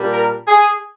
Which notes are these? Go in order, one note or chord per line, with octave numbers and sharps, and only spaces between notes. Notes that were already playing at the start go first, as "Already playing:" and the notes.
Already playing: A#2 G3 D4
A#4
G#4